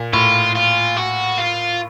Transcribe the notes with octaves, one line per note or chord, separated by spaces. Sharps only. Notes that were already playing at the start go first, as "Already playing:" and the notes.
Already playing: A#2
A2 F4
F4
F#4
F4